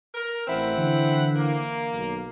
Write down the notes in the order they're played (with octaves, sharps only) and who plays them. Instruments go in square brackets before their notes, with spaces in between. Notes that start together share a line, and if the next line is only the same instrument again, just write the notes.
[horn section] A#4
[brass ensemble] A1 [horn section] C4 E4 F#5
[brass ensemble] D3 E3
[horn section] A#3
[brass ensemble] B1 D#3